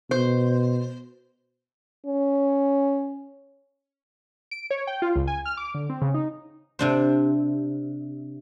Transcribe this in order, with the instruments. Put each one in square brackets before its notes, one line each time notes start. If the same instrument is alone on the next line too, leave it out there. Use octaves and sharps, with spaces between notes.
[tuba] B2 [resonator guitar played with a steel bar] C5
[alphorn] C#4
[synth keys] D7
C#5
G5
F4
C#2
G#5
F6
D6
D3
C4
C#3
D#4
[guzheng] C3 D4 C5